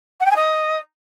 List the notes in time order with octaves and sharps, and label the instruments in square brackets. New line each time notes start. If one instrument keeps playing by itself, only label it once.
[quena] F#5
G5
G#5
D#5